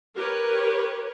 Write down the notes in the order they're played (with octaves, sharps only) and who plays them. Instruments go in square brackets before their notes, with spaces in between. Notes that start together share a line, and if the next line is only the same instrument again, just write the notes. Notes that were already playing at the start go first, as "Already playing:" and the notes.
[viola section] G4 A#4 B4 C#5